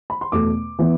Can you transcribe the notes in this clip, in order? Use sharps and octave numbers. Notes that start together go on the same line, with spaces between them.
B5
C6
E2 B2 A3 D6
E3 B3